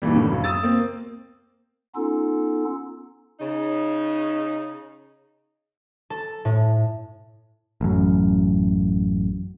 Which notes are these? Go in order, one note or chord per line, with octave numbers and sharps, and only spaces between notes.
D#2 A#2 E3 G3
A2 D3
C#2 F#2
D#6 E6 A6
A#3 C4
B3 C#4 D#4 F4 A4
C#3 D#4
A4
A2
A1 F#2